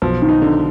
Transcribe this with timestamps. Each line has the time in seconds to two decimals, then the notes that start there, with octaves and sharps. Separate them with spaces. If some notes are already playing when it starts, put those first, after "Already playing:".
0.02 B1 F3
0.22 D#3
0.29 D#4
0.42 D3